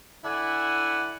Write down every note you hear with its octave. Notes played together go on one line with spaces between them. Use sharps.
D3 E4 D5 E5 F#5 G#5